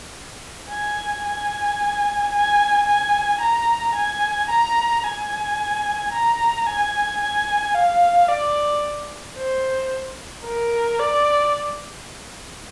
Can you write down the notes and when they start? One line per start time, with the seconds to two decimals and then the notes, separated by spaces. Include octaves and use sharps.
0.70 G#5
1.24 G#5
2.33 G#5
2.87 G#5
3.41 A#5
3.95 G#5
4.50 A#5
5.03 G#5
6.12 A#5
6.66 G#5
7.20 G#5
7.74 F5
8.29 D5
9.37 C5
10.46 A#4
10.99 D5